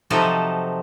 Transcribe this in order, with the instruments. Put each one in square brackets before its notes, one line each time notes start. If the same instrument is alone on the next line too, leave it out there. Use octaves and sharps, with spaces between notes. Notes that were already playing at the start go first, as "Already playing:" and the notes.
[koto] C3 F3 F#3 D#4 A4